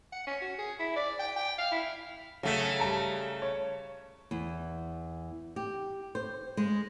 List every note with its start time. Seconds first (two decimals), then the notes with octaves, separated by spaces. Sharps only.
0.13 F#5
0.27 C#4
0.42 F#4
0.59 G#4
0.79 E4
0.96 D5
1.19 G5
1.36 G5
1.58 F5
1.71 E4
2.43 C#3 F#3 A3 B6
2.80 G3 A5 A#5
3.42 C#5
4.31 E2
5.56 G4
6.15 C5
6.57 G#3